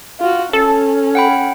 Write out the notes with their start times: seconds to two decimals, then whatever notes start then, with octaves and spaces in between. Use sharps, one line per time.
0.20 F4 F#4
0.53 C#4 A4
1.15 F#5 G5 B5